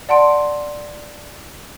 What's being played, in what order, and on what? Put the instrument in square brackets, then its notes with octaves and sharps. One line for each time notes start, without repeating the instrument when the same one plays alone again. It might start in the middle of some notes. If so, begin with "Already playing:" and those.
[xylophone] D5 F#5 A5 C6 D7